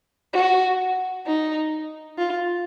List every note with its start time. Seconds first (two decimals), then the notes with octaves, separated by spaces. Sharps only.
0.33 F#4
1.27 D#4
2.18 F4